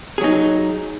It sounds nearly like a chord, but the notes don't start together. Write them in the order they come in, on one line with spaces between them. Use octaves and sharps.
G#4 F#3 D#4